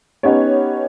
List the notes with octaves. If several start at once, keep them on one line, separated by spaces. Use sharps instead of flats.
B3 C#4 D#4 G4 C#5